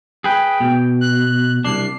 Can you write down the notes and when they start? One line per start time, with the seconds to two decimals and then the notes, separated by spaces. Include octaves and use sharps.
0.24 G#4 B4 G5
0.60 B2
1.01 F#6
1.65 C2 D4 C7